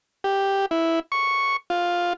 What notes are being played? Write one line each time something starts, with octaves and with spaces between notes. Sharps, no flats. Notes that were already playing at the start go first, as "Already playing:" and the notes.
G4
E4
C#6
F4